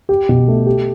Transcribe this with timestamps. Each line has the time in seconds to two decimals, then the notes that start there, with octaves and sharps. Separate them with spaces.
0.09 G4
0.29 B2
0.48 A3
0.66 G4